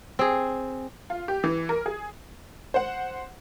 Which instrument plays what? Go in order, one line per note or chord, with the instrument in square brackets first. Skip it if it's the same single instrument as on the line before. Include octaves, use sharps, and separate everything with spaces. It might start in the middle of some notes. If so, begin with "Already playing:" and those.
[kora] C4 G#4
[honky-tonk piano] F4
G4
E3
A#4
G#4
C5 F#5